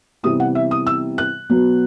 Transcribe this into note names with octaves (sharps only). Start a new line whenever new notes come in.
C3 E3 G3 B3 D#6
F#5
E5
D#6
E6
F#6
B2 F#3 B3